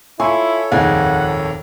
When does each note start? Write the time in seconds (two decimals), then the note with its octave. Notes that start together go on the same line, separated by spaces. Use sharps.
0.20 E4 F4 A4 C#5 G#5 C6 C#6
0.72 D#1 G#1 F2 D#4 G#4 F#5